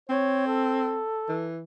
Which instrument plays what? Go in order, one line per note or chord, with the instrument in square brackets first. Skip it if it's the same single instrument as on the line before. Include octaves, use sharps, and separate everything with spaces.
[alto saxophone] C4 [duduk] C#5
[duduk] A4
[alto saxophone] E3